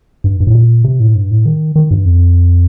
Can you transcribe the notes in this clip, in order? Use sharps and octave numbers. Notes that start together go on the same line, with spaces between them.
G2
G2
A2
A#2
C3
A2
G2
A2
D#3
D#3
G2
F2